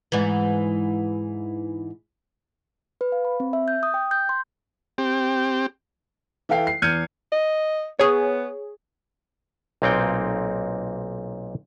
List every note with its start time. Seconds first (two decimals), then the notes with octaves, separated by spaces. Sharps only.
0.12 G#2 E3
3.01 B4
3.12 F5
3.25 B5
3.40 C4
3.53 E5
3.68 G6
3.83 D#6
3.94 G5
4.11 G6
4.29 C6
4.98 C4 G4
6.49 E3 E4 A4 F5 G5 C7
6.67 C7
6.82 E2 F6 G6 G#6 C#7 D#7
7.32 D#5
7.99 B3 G#4 C#5
9.82 B1 A#2 A#3 C4 D#4 G5